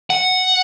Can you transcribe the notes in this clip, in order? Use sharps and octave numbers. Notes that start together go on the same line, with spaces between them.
F#5